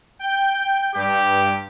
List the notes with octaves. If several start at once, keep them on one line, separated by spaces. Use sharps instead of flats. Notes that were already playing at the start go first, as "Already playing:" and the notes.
G5 G6
G2 G4